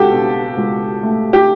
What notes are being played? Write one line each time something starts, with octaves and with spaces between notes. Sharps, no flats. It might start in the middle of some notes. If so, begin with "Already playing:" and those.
Already playing: C#2 F#4 G4 A4
B2
C#2
A3
G4